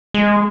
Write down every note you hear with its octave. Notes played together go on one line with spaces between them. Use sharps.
G#3